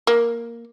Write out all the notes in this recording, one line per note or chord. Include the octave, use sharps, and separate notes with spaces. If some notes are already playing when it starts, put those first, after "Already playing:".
A#3